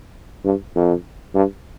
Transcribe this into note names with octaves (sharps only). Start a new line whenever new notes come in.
G2
F2
G2